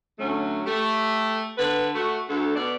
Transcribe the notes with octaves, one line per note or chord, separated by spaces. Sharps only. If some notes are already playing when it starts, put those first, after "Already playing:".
D3 F#3 A3 C#4
A3 G4
D3 B4
A3 F#4
D2 A4
B2 D5